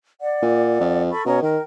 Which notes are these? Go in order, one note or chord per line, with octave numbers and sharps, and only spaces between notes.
D5 F#5
A#2
F2
A4 B5 C#6
B2 C#4 A#5
D#3 A#4 G5